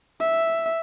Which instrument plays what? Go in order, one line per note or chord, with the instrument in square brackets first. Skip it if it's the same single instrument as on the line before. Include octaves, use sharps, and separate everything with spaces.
[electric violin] E5